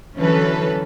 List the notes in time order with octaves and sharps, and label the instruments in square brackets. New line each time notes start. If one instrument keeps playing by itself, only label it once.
[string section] D3 E3 F#3 C#4 A4 B4